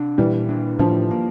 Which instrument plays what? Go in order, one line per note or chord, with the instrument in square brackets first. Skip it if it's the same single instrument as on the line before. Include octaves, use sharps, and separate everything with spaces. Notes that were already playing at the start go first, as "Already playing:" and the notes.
Already playing: [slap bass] C3 D4
[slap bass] A#2 [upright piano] E3 G3
[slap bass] D4
[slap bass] A2 [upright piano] D3 F3
[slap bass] A#3